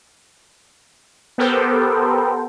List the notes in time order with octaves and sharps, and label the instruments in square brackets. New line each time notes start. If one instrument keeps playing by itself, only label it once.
[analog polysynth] B3 G4 A4 A#4 C5 G5